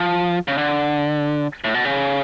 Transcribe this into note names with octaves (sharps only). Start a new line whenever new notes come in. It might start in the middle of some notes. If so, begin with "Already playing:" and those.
Already playing: F3
C#3
D3
A2
B2
C#3